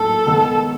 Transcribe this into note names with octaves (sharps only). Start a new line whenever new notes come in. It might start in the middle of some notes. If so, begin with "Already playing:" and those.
Already playing: A2 F#3 A#3 D#4 A4
D#3 G#3 B3 D#4